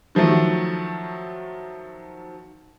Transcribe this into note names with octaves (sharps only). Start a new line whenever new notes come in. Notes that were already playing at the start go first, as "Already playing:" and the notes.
D#3 F3 F#3 A3